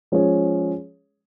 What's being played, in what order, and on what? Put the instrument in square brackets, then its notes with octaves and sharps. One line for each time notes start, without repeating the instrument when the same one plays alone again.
[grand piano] F3 G#3 C#4 G#4 C#5